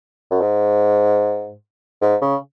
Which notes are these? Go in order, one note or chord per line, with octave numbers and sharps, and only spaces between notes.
F#2
G#2
G#2
C#3